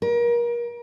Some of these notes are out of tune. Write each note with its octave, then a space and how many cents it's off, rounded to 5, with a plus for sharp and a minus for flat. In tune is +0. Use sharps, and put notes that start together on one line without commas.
A#4 +30